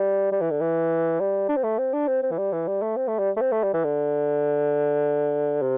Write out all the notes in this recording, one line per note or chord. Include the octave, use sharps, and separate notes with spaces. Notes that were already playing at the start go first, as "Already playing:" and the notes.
Already playing: G3
G3
E3
D3
E3
G3
D4
C4
A3
C4
D4
C4
C4
E3
G3
E3
G3
A3
C4
A3
G3
A3
C4
A3
G3
E3
D3
C3